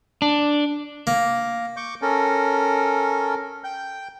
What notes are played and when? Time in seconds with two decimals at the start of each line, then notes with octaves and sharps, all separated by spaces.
0.22 D4
1.07 A#3
1.77 C#6 D6 G6
2.02 C#4 A4 A#4
3.64 G5 G6